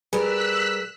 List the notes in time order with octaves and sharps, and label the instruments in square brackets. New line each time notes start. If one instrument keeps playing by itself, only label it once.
[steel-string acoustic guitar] G3 A#4 [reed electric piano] G#4 B4 [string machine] E6 F#6 B6